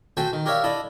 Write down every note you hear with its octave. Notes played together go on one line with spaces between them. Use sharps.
F#4 A4 C5 E5 G5 G#5
D#3
G4 A#4 C#5 D5 E5 F5
D4 E4 A4 D5 D#5